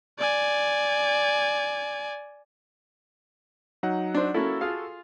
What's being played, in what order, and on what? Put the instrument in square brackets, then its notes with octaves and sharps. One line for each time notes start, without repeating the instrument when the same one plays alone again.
[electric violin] D5 G#5
[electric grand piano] F#3 D#4 F#5
[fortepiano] D4 C5
[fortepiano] A#3 C#4 E4 [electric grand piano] F#4 A4
[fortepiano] F4 G#4 F5